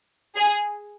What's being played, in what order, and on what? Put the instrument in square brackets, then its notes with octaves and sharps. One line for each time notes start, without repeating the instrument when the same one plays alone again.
[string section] G#4